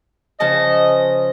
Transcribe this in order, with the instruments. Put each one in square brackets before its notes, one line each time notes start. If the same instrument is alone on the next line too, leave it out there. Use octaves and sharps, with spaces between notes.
[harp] C#3 F3 A5 [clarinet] D#5